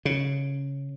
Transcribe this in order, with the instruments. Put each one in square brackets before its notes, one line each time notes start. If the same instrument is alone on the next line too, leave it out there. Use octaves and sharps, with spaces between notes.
[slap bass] C#3